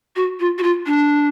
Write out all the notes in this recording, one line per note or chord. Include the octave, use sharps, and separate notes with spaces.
F#4
F4
F#4
F4
D4